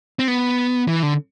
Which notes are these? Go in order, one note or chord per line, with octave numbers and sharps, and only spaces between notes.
C4
B3
E3
D3